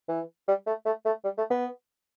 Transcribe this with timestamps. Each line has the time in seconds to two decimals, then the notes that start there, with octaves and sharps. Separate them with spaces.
0.08 E3
0.48 G3
0.66 A3
0.85 A3
1.05 A3
1.24 G3
1.38 A3
1.51 B3